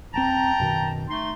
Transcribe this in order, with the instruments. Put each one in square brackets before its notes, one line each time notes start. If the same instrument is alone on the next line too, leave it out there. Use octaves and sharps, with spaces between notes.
[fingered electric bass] D#1 C4 [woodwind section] G5 A5 A#5
[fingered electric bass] F#2 B2 D#3
[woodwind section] A3 D#4 C6